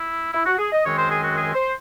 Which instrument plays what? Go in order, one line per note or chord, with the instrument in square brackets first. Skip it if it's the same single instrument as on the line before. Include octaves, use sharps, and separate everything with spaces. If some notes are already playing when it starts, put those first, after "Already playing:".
Already playing: [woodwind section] E4
E4
F#4
G#4
D#5
F#2 D#3 G#3 C4 C#5
C5
G#4
F#4
G#4
C5